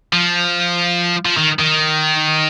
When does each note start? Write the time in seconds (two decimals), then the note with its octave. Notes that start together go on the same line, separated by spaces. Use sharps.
0.13 F3
1.25 F3
1.38 D#3
1.60 D#3